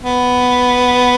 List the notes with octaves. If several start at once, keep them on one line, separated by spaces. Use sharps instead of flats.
B3